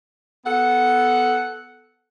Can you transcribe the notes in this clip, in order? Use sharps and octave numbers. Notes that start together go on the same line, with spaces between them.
B3 A4 F#5